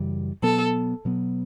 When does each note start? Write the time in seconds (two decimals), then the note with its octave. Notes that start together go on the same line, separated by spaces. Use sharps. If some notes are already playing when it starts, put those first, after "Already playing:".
Already playing: F#2 C#3 E3 G3
0.42 B2 F#3 B3 A4
1.05 B2 F#3 B3